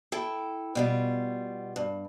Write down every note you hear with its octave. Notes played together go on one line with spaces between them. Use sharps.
E4 A4 G5
B2 G3 F4
G2